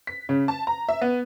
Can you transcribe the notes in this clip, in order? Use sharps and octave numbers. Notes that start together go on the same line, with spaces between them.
B6
C#3
A5
A#5
E5
B3